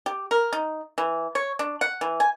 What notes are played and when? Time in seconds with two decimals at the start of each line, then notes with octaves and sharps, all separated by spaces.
0.06 G4
0.31 A#4
0.53 D#4
0.98 E3
1.35 C#5
1.59 D4
1.81 F#5
2.01 E3
2.20 G#5